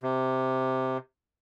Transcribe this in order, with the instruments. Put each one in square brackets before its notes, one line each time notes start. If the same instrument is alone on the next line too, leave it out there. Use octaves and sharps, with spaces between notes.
[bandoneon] C3